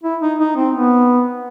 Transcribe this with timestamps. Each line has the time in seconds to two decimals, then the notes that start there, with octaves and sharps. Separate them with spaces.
0.04 E4
0.21 D#4
0.39 D#4
0.56 C4
0.73 B3